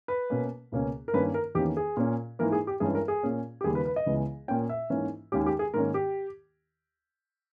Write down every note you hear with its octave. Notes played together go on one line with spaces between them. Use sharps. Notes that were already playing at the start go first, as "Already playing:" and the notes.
B4
B2 A#3 C#4
C#2 B2 A#3 C#4
A#4
G2 D#3 A#3 C#4 B4
A#4
E2 D#3 A#3 C#4 G4
G#4
A#2 A#3 C#4
G#2 E3 A#3 A#4
G#4
G4
G2 E3 G#3 C#4 G#4
A#4
G#4
A#2 A#3 C#4
G4
D#2 C#3 G3 A#3 G#4
B4
B4
D#5
C#2 C#3 E3 G#3 B3
A#2 A#3 C#4 G5
E5
G#2 E3 A#3 C#4
D#2 D#3 G#3 C#4 G4
G4
G#4
G#2 D#3 A#3 C#4 A#4
G4